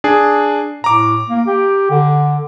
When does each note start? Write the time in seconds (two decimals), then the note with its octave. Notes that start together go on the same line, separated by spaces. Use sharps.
0.04 D4 G#4
0.84 A2 A#5 D6
1.29 A#3
1.47 G4
1.91 D3